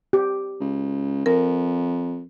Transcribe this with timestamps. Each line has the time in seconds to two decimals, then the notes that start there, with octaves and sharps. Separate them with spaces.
0.13 G4
0.60 C#2
1.26 F2 A#4